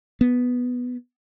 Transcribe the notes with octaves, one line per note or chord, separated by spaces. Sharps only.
B3